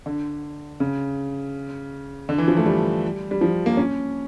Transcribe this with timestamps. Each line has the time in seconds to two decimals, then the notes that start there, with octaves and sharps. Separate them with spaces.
0.06 D3
0.80 C#3
2.29 D3
2.38 E3
2.48 F3
2.57 A3
2.66 G3
3.31 G3
3.41 F3
3.66 A#3
3.77 C#4